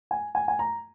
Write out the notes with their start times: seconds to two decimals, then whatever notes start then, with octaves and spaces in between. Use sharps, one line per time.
0.11 G#5
0.35 G#5
0.48 G#5
0.59 A#5